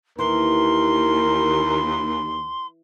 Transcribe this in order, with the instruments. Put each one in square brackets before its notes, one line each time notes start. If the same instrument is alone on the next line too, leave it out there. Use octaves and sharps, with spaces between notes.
[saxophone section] D#2 [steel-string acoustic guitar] E3 [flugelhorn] A#4 [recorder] C6